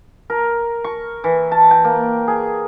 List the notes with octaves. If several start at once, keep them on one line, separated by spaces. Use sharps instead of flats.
A#4
C#6
E3
A5
G5
A#3
G#4